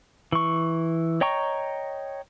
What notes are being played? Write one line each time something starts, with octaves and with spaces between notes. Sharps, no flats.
E3 C#6
C#5 D#5 G5 A#5 C#6